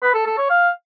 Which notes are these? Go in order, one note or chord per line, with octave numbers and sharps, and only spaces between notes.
B4
A4
A4
C#5
F5